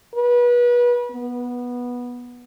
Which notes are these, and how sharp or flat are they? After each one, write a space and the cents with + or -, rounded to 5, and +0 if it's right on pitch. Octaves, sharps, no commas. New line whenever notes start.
B4 -30
B3 -10